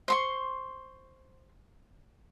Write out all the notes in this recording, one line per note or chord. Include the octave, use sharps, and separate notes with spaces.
C5 C6 C#6